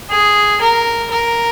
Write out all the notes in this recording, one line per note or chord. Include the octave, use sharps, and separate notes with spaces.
G#4
A#4
A#4